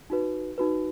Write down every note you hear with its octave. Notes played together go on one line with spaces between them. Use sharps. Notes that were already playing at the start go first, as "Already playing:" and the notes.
D#4 F#4 B4
D#4 F#4 B4